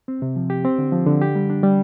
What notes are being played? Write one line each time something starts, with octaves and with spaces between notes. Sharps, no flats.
C4
C3
F3
G4
C4
D3
F3
D3
G4
G3
D4
G3